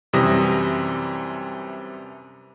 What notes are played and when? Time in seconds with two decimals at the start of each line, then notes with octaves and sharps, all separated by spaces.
0.13 F#2 C3 E3 G3 D#6 A#6